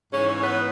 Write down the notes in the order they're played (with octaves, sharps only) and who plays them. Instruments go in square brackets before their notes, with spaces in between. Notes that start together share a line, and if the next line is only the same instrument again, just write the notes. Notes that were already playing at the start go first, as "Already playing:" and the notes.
[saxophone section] G#2 E3 C#4 C#5
C#4 C#5
B3 B4